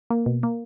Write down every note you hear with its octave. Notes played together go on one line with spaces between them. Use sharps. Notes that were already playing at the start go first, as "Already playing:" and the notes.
A#3
B2
A#3